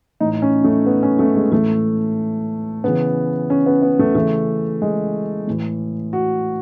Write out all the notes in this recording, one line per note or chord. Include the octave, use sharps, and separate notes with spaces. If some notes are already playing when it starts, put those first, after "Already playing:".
A2 E3 D#4
C#4
A3
B3
C#4
A3
G#3
A2 E3 A3
C#3 E3 B3
C#4
B3
B3
A3
C#3 E3 A3
G#3
A2 E3
F#4